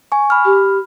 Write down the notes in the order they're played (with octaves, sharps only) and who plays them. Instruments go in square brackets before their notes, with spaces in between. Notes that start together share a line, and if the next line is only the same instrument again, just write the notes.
[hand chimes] G#5 C#6
B5 F6
[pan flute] G4